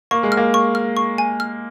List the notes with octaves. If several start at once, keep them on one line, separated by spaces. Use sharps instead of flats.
A#3 C#6
G#3
F6
A#3
C#6
F6
C#6
G#5
F6